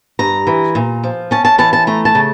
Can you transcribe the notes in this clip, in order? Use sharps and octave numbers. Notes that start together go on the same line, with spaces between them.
G2 A#5
E3
A#2
F3
C#4 A5
A5
E3 A5
A5
A3 A#5
A5
C#3